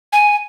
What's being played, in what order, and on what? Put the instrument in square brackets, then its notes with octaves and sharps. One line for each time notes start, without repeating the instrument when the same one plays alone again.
[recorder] G#5